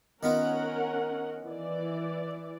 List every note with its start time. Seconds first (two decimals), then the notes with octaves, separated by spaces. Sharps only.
0.23 D#3 B3 C#4 F4 A#4 F#5
1.45 E3 D5